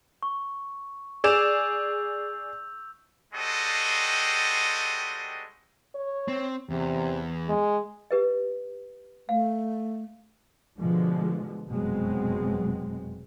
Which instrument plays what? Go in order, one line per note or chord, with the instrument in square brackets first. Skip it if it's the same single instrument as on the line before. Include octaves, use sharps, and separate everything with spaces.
[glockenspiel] C#6
[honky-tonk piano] G#4 D5 E7 [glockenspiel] E6 G6 F7
[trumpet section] G3 G#3 C4 F#4 A4 D#5
[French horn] C#5
[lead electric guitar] C4
[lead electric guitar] E2 [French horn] C3
[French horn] G#3
[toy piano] G4 B4 D#5
[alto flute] A3 [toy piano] F5
[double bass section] B2 D3 F3 G#3
F1 F#2 B2 F#3 G#3 C4